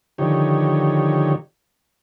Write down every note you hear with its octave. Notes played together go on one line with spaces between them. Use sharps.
D3 D#3 F3 D#4 G4 C#5